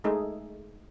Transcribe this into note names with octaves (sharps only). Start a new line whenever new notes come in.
G#3 A3 D#4 G#4